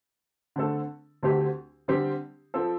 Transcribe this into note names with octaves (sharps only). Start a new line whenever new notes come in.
D3 A3 C4 A4
D2 D3 A3 C4 G4
D3 G3 C4 G4
F3 C4 A4